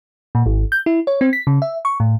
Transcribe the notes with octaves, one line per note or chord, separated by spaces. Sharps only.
A#2
G#1
G6
E4
C#5
C4
B6
C#3
E5
C#6
A2